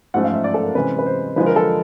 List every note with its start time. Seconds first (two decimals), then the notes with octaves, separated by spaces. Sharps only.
0.14 G#2 F3 A3 C#4 F#5
0.24 F5
0.34 E5
0.44 D5
0.54 A4
0.65 A#4
0.75 C3 E3 G#3 C#4 B4
0.99 B4
1.06 C5
1.36 D3 F3 G#3 B4
1.46 A#4
1.56 A4